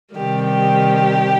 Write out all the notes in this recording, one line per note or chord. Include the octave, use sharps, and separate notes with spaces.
C3 D#3 G3 G4
G4